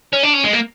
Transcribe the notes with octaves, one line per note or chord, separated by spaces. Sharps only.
C#4
D4
C#4
G#3
A#3